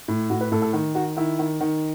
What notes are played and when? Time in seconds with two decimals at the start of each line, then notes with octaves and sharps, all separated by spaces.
0.08 A2
0.29 A2 F#4
0.41 B4
0.52 A2 A4
0.62 A4
0.73 D#3
0.95 D#3 F#4
1.17 D#3 E4
1.39 D#3
1.61 D#3